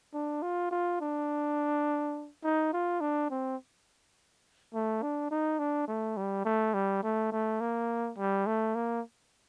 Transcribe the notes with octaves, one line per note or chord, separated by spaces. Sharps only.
D4
F4
F4
D4
D#4
F4
D4
C4
A3
D4
D#4
D4
A3
G3
A3
G3
A3
A3
A#3
G3
A3
A#3